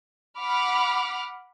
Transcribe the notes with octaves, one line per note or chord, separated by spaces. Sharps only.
F#5 B5 D6 F6